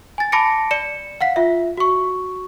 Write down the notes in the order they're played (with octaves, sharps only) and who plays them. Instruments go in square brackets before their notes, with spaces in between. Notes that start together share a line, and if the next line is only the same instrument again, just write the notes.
[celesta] G#5 A6
A5 B5 D6 A#6 C#7 D7
D5 C#7 E7
F5 F#5 B6
F4 E5
F#4 C#6